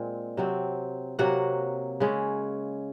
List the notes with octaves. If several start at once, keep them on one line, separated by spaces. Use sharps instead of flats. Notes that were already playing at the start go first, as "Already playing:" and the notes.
Already playing: A#2 G#3 C4
C3 F#3 C4
C3 F#3 A#3 F#4 F#5
C#3 G#3 C#4